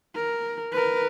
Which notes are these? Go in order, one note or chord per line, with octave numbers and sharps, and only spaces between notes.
A#4
A#4 B4